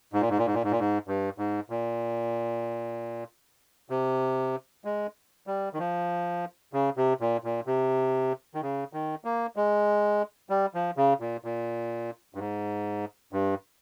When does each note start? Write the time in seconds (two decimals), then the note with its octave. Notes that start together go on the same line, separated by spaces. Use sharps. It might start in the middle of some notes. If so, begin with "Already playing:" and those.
0.13 G#2
0.21 A#2
0.29 G#2
0.38 A#2
0.46 G#2
0.54 A#2
0.64 G#2
0.71 A#2
0.79 G#2
1.08 G2
1.38 G#2
1.70 A#2
3.90 C3
4.85 G#3
5.47 G3
5.74 D#3
5.79 F3
6.73 C#3
6.97 C3
7.21 A#2
7.44 A#2
7.67 C3
8.55 D#3
8.62 C#3
8.93 D#3
9.25 A#3
9.56 G#3
10.50 G3
10.74 F3
10.97 C#3
11.20 A#2
11.44 A#2
12.35 G2
12.39 G#2
13.33 G2